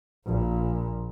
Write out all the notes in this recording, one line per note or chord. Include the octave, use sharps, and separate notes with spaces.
A#1 A#2